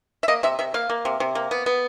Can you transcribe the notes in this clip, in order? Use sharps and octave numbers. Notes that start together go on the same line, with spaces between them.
E5
A#3 D#5
C3 E5
C3 E5
A#3 F5
A#3
C3
C3
A#3
B3
B3